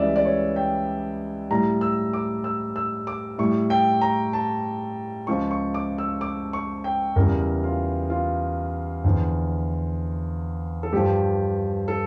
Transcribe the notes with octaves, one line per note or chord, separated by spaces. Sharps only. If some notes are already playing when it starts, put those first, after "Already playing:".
Already playing: C#2 C#3 E3 G3 D5 E5
D5
C#5
G5
A2 G3 A#5
E6
D6
E6
E6
D6
A2 G3 C#6
G5
A#5
A5
C#2 C#3 F3 C#6
C#6
D6
E6
D6
C#6
G5
E2 C#3 E3 G3 A#4
F4
F4
E2 D3 F3
A4
G2 F3 G4
A4